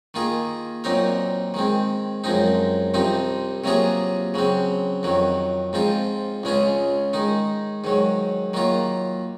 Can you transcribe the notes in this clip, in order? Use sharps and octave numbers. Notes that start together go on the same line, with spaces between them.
D#3 A#3 F4 G#4
A#2 F#3 C4 D#4 A#4
D#3 G#3 C4
F#2 F3 G#3 C4 D#4
C2 C3 F3 C4 D#4
C3 F#3 A#3 F4 G#4
C#3 F#3 C4
F2 D#3 F#3
G#2 F3 C4 F4
C#2 C#3 G#3 C#4 F4
D#3 G#3 D#4
G#2 D#3 F#3
D#3 F#3 A#3 F4